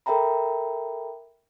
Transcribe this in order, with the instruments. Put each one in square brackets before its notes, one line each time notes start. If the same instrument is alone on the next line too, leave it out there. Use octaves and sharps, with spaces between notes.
[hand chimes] A4 A#4 E5 G5 A#5 B5